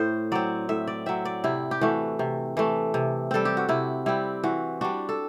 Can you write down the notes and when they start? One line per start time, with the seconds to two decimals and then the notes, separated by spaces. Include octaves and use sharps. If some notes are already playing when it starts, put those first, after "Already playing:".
Already playing: A2 C5
0.32 F#3 C4 D5
0.69 A2 E5
0.87 D5
1.06 F#3 C4 E5
1.25 D5
1.44 C3 E4
1.71 G4
1.81 E3 A3 F#4
2.19 C3
2.57 E3 A3
2.94 C3
3.31 G3 C4 A4
3.45 G4
3.57 F#4
3.69 C3 E4
4.06 G3 C4 E4
4.44 E3 F#4
4.81 G3 D4 F#4
5.09 A4